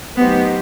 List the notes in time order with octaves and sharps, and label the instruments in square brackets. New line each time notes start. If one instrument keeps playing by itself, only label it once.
[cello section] F#3 A3 D#4 G4 C5 [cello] B3